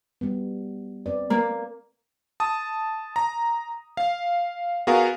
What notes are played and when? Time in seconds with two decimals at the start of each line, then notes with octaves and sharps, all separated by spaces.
0.21 G3 B3
1.06 C4 B4 D5
1.30 A#3
2.40 A5 D#6
3.16 A#5
3.97 F5
4.87 B3 F#4 G#4 A#4 F5